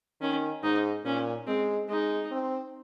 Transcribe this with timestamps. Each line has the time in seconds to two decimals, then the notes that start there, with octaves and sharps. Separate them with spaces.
0.21 D#3 C#4
0.63 G#2 D#4
1.05 A#2 C#4
1.47 G#3 C4
1.89 G#3 D#4
2.31 C4